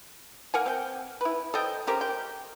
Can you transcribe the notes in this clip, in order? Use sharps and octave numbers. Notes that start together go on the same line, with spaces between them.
A#3 A#4 F#5 G#5
C4 G5
E4 B4
A4 C5 D#5 G5
C#4 G4 A#4 C5
G5